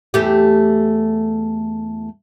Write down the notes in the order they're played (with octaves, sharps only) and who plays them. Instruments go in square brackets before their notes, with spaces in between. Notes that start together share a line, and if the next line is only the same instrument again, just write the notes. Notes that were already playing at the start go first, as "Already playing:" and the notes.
[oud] E2 A3 G4